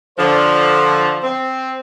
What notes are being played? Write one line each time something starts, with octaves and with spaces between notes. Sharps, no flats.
D3 F3 C5
C4